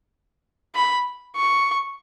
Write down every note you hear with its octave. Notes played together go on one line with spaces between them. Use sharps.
B5
C#6